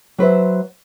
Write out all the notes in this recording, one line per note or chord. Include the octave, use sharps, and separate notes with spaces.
F#3 B4 C5 E5